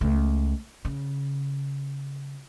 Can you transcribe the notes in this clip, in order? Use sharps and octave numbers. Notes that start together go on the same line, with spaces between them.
C#2 A3
C#3